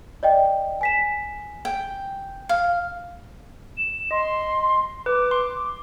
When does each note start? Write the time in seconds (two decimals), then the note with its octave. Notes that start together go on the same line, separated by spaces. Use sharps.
0.23 D5 D#5 G5
0.81 G#5 B6 E7
1.65 G5
2.49 F5
3.77 E7
4.11 D#5 C6
5.06 B4 D6
5.31 C6